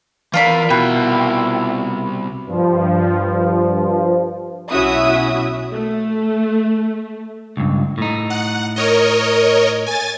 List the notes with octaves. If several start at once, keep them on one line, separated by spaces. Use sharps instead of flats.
E3 F4 A#4 D5 B5
C2 B2 E4 G5
G2 F3
B1 C#4 E4 F#4 E5 D#6
A3
C#2 G2
A2 D#4
F#5
A#4 C#5 D#5
G#5 A6